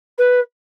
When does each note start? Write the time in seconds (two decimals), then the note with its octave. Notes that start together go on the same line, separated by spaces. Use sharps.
0.18 B4